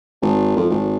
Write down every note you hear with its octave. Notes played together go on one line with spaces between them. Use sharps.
G#1
F2
G#1